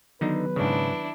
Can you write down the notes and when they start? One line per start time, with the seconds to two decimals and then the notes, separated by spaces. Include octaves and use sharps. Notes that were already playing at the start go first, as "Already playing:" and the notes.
0.21 D3 D#3 F#3 B3 D#4 B4
0.56 G#2 C#3 D4 E4